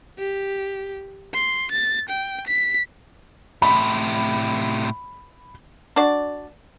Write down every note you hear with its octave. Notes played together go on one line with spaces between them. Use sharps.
G4
C6
A6
G5
B6
A2 C3 B5
D4 F#4 D5